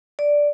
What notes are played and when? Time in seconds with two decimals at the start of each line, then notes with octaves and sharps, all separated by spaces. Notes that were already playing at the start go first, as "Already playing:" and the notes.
0.19 D5